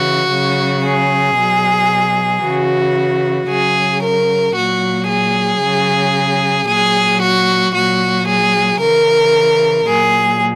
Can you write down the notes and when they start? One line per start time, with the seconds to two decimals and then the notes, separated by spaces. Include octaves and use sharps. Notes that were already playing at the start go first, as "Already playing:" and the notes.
Already playing: C#3 E3 F#4
0.30 C#3 F#3
0.83 G#4
1.36 B2 F#3
2.43 C#3 E3 F#4
3.49 C#3 F#3 G#4
4.02 A#4
4.55 A#2 F#3 F#4
5.08 G#4
5.62 C#3 F#3
6.68 A#2 F#3 G#4
7.21 F#4
7.74 A#2 F#3 F#4
8.27 G#4
8.80 C#3 E3 A#4
9.87 A#2 F#3 G#4